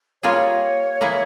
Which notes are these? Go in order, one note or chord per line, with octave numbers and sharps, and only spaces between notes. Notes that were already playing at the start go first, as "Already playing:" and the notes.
G3 A#3 F4 G#4 C#5
E3 A#3 E4 G#4